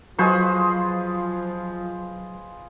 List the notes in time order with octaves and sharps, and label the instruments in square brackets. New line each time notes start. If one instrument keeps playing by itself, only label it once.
[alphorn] F3 [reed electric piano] F#3 C#6 [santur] F4 G#4 D#5 [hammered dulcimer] B4 C5